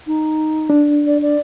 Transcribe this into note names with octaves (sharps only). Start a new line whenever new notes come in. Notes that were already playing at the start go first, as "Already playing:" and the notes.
D#4
D4
D5
D5